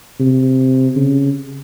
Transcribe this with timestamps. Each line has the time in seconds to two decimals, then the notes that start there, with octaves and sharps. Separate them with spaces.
0.20 C3
0.96 C#3